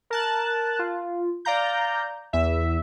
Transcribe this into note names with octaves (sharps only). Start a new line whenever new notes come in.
A#4 A5 F#6
F4
D5 F5 A#5 G6
E2 E5